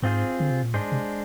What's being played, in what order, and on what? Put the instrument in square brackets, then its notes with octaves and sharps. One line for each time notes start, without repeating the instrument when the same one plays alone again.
[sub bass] G#2 [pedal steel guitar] C4 F4 G#4 C5
[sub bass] D3
C3
A#2
[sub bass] G#2 [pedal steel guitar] G#3 D4 G#4 C5
[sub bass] C3